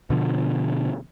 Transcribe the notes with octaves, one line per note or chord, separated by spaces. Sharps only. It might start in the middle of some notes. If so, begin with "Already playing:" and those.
B2 D3 F3